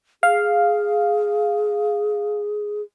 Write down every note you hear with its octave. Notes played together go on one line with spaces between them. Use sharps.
G#4 F5